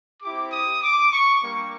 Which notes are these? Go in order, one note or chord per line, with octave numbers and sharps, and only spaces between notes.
C4 E4 G4 D6
D#6
D6
C#6
G3 A#3 D4 C#6